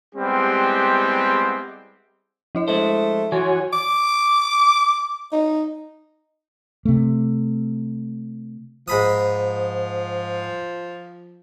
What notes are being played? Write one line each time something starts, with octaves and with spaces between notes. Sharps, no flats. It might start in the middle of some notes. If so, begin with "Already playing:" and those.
G3 G#3 B3 C4 E4 G4
F3 E4 D#5
G#3 A3 C5
E3 F#4 C#5 G#5 C6 C#6
D6
D#4
C3 A3
G#2 F3 B5 D#6